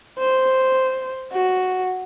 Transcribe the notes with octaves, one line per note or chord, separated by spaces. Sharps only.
C5
F#4